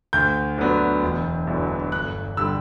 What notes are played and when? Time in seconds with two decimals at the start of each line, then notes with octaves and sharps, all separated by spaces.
0.13 D2 G6
0.58 D3 F#3 B3 D4
1.03 E1
1.47 E2 D3 F#3 B3
1.92 G1 F#6
2.37 D3 G3 E6